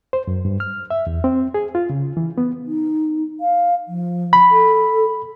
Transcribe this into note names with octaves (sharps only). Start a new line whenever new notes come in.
C5
F#2
G2
F6
E5
E2
C4
G#4
F4
C#3
E3
B3
D#4
F5
F3
B5
A4